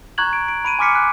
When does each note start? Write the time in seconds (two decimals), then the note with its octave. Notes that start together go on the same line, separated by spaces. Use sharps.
0.18 A#5 C#6 F#6 G#6 F#7
0.33 D7
0.48 D7
0.65 B5 D7 D#7
0.79 G#5 C6 D6 F6 B6 C#7
0.95 F#6